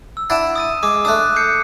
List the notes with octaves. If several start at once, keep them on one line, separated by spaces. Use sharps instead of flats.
E6
D4 E4 F#5 A6 D7 E7
D#6 A6 D#7
G#3 D6
A3 D4 D#6 F#6
G6 C7 C#7